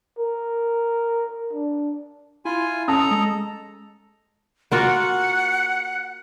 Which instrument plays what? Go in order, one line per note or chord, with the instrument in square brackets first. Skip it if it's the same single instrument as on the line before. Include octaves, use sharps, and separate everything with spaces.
[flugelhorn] A#4
D4
[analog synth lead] E4 [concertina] F4 G#5
[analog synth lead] C#4 [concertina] A4 A#5 [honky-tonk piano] A5 D#6
[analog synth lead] G#3
[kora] A#3 F4 F#4 [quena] F#5